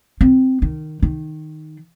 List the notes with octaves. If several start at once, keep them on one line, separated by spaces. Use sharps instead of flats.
C4
D#3
D#3